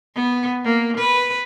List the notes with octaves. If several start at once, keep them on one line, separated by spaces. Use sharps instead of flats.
B3
A#3
B4